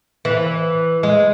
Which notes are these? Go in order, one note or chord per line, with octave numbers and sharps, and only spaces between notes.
E3
G#3